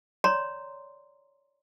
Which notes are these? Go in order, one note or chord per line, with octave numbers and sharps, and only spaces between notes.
C#5 D5 A#5 C6